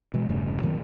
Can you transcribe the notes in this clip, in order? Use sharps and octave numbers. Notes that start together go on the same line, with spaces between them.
B2 E3 G#3
E1 G2 C#3 A3
A#2 D#3 F#3 C4